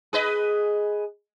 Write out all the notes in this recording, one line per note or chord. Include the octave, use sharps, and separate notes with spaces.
G#4 B4 D#5